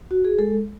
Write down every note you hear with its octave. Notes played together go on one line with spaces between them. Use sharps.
F#4
G#4
G#3 A4